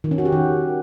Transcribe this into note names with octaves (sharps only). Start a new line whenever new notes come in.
D#3
C#4
F#4
G4
D#3